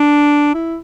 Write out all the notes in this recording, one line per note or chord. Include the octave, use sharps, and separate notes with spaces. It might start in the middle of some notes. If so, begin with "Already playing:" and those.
Already playing: D4
E4